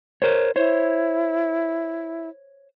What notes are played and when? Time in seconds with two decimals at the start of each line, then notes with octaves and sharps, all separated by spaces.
0.22 A#4 C5 C#5
0.56 E4 C5 C#5